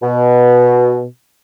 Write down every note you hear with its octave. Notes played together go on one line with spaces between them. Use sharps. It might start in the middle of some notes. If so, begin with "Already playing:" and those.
B2